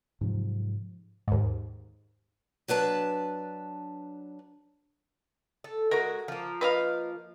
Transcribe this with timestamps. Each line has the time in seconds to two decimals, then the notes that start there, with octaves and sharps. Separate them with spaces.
0.21 G#2 C3 F3 F#3
1.28 D#2 G#2
2.68 F#3 D4 B4 A5
5.64 A4
5.91 G#3 F#4 A#4
6.28 F3 A#3
6.61 B4 D#5 F5